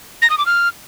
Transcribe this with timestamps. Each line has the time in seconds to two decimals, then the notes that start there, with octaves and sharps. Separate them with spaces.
0.22 A#6
0.30 D#6
0.38 D6
0.46 F6